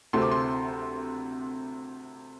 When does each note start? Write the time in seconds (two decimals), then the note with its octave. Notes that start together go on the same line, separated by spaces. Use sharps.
0.13 D2 C3 A3 C4 C6
0.22 D6
0.31 C6